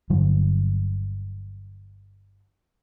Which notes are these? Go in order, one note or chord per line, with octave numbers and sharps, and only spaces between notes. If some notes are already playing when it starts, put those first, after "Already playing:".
G1 D3 F#3 G3